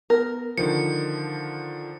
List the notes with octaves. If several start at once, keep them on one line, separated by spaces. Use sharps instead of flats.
B3 A#4
D3 D#3 F3 C#7